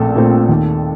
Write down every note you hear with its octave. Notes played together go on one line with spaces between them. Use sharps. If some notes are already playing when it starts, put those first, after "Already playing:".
Already playing: A#1 A#2 A3 C4 A4
A#2 A3 C4
D#2